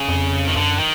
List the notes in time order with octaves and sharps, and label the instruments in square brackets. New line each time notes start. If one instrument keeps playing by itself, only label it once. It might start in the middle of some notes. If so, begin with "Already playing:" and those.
Already playing: [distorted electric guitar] C#3
[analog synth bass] F2
[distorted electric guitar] D#3
[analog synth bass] F#2 [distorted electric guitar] D3
[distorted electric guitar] D#3